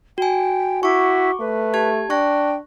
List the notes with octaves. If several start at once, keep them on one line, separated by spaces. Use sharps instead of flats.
F#4 G5 G#5
E4 F#4 C#6 D6
A3 B4
G4 A5 G#6
D4 G5 C#6 F#6 A#6